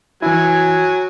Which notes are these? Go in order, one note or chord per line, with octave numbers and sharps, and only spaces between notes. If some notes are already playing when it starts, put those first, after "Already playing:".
E3 F#3 E4 G#5